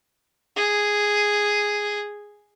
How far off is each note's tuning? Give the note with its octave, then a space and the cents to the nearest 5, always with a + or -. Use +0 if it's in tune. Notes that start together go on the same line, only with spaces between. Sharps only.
G#4 -5